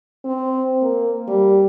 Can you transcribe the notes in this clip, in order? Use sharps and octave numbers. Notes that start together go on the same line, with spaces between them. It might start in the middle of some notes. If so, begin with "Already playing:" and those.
C4
A#3
G3